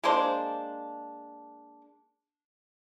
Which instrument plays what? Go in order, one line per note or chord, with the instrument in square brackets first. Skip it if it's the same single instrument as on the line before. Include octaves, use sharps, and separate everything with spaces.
[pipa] G#3 A#3 D4 C5